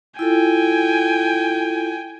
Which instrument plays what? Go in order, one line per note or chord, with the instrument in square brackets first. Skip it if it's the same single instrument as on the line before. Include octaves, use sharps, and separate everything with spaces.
[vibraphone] E4 F4 A4 [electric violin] G5 G#5